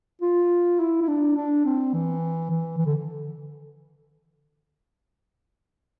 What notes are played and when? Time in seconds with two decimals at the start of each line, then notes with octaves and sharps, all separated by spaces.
0.22 F4
0.80 E4
1.02 E4
1.08 D4
1.37 D4
1.65 C4
1.94 E3
2.50 E3
2.78 E3
2.86 D3